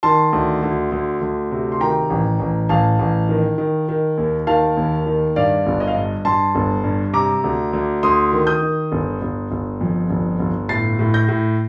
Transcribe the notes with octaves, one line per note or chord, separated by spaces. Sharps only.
D#3 A5 C6
D2
D2
D2
D2
C3
C6
D#3 G5 A#5
A1
A1
A1 F5 A5
A1
D#3
D#3
D#3
D#2
D#3 F5 A5
D#2
D#3
G2 D5 F5
G1
D#5
F5
G2 D#5
G2 A5 C6
G1
G2
C3 A#5 D6
D2
D2
D2 C6 D#6
D#3
D#6 G6
D#3
G1
G1
G1
F2
G1
G1
A2 A6 C7
A2
G6 A#6
A2